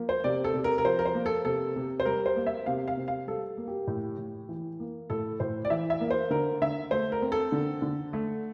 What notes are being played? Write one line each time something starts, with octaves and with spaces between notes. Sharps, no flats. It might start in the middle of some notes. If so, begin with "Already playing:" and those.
Already playing: F3 A#3
C5
C3 D5
A4
C3
A#4
A#4
F3 C5
A#4
C5
A#3
A4
C3 A4
C3
C5
G3 A#4
C5
A#3
E5
C3 F5
F5
C3
F5
G3 A4
A#3
G4
A2
A2
E3
A#3
A2 A4
A2 C5
D5
E3 E5
E5
A#3
C5
D3 A#4
D3 E5
A3 C5
A#4
C4
A4
D3
D3
A3